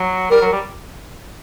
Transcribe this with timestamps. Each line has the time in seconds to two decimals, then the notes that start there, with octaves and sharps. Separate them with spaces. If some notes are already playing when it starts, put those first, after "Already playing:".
Already playing: F#3
0.30 G3 A#4
0.41 F#3
0.53 G3